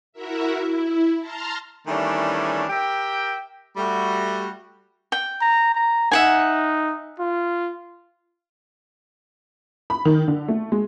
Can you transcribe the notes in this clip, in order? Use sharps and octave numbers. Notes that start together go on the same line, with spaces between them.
E4 F#4 A#4 E5
E4
A5 A#5 C6 F6
D#3 E3 G3 A3 C#4 D4
G4 A#4 E5 G5
G3 A3 F#4
G5
A#5
A#5
D#4 E5 F#5 G#5
F4
B5
D#3
D3
A3
G#3